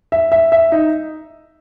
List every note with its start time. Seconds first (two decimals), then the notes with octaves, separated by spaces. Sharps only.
0.12 E5
0.32 E5
0.52 E5
0.72 D#4